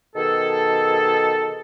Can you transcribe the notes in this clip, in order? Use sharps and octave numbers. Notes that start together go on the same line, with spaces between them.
B2 D#3 G#4 A4